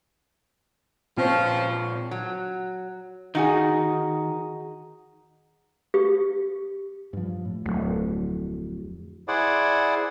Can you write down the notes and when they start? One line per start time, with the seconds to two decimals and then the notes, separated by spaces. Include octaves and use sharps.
1.17 A#2 F3 C4 C#4 C5
2.11 F#3
3.35 D#3 D#4 F#4 G#4
5.94 G4
7.13 G2 F3
7.45 A2
7.66 D1 F2 F#3 A3
9.28 E4 G#4 C5 D5 F#5